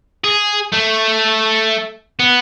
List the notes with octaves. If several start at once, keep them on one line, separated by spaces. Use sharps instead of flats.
G#4
A3
B3